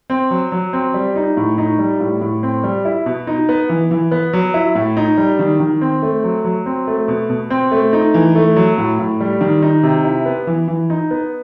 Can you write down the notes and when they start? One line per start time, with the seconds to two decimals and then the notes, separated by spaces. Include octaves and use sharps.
0.10 C4
0.31 F#3
0.52 F#3
0.73 C4
0.94 G3
1.16 D#4
1.37 A2
1.58 D#4
1.79 G3
2.00 A2
2.21 A2
2.43 C4
2.64 G3
2.85 E4
3.06 B2
3.27 D#4
3.49 B3
3.69 E3
3.91 E3
4.11 B3
4.33 F#3
4.54 E4
4.75 A2
4.97 D#4
5.18 G3
5.39 D#3
5.60 D#3
5.81 C4
6.02 A3
6.24 F#3
6.45 F#3
6.66 C4
6.87 A3
7.08 B2
7.30 B2
7.50 C4
7.72 A3
7.93 D#4
8.14 E3
8.35 A3
8.56 F#3
8.78 A2
8.99 A2
9.20 G3
9.41 D#3
9.62 D#4
9.83 C3
10.05 E4
10.26 B3
10.47 E3
10.68 E3
10.90 D#4
11.11 B3